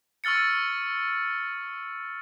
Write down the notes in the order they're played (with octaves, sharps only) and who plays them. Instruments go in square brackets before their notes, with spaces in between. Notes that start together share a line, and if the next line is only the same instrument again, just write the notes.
[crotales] C#6 E6 F6 A6 C#7